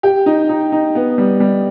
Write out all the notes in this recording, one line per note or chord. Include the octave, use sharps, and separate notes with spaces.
G4
D#4
D#4
D#4
B3
G3
G3